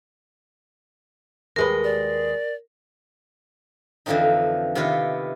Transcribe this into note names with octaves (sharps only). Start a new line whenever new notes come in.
D#2 G#3 A#4 B4
D5
F2 D3 E3 F3 C4 D#4
C3 D#3 B3 E4 F4 B4